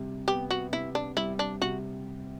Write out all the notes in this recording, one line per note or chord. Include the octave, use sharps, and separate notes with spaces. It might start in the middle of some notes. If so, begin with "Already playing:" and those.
Already playing: C3 G3
B3 G4
F#4
C3 E4
D4
G3 E4
D4
C3 F#4